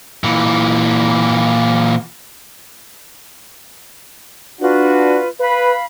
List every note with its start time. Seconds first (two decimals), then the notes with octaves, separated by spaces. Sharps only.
0.24 A#2 E3
4.61 D4 F4 F#4 B4
5.40 B4 F5 B5